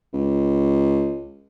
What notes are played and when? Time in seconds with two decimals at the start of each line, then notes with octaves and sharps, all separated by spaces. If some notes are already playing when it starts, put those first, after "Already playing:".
0.13 C#2